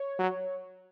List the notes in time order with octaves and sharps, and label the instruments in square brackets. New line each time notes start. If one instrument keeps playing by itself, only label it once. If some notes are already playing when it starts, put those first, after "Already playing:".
Already playing: [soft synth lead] C#5
[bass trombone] F#3